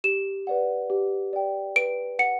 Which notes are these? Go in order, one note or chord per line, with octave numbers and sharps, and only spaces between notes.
G4 E7
B4 D5 F#5
G4
D5 G5
B4 D7
F#5 C#7